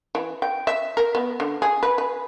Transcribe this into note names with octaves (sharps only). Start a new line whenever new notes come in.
E3
G5
E5
A#4
B3
D3
G#4
B4
B4